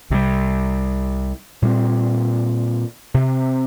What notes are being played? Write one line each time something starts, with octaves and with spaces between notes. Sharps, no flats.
C2 C3 D#3 G3
A#2 G3 C4
C3